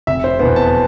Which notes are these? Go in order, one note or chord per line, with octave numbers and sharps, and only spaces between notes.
F1 E5
C5
E2 B2 B3 C5
A5